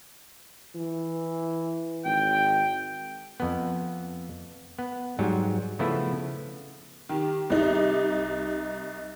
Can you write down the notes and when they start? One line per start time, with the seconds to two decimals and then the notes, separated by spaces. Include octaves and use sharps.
0.76 E3
2.05 G#1 G5
3.40 F2 B3
4.79 B3
5.19 G#2 F#3 G3
5.79 C#3 F3 A3 B3 E4
7.09 D#3 G4
7.50 C2 D#4